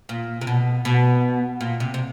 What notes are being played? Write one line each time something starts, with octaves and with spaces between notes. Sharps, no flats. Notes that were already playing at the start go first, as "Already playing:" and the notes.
A#2
C3
B2
B2
A#2
C3
C3